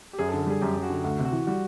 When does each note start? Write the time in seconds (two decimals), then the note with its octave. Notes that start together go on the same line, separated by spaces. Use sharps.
0.13 G4
0.19 F#2 G#4
0.29 A4
0.33 D3
0.39 A4
0.47 G3 G#4
0.61 F#2 G4
0.76 F#2
0.83 F#4
0.89 D3
1.04 D2 F#4
1.19 C3
1.25 F#4
1.32 E3
1.47 G3 F#4